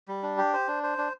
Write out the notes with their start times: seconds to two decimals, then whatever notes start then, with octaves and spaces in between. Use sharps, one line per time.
0.08 G3
0.23 D4
0.38 G4
0.53 C5
0.68 D4
0.83 C5
0.98 D4